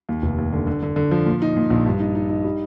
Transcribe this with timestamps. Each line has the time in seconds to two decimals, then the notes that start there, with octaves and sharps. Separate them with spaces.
0.09 D#2
0.22 F1
0.38 D#2
0.52 D3
0.67 D3
0.83 D3
0.96 D3
1.11 F3
1.26 A#2
1.42 D#4
1.57 A#2
1.70 A#1
1.86 G2
2.00 D#4
2.15 D#4
2.30 D#4
2.44 G3